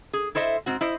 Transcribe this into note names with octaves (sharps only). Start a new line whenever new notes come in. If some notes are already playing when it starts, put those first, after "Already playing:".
G#4
E4 A4 C5 D#5 E5
G#2 C4 F#4
E4 C5 D#5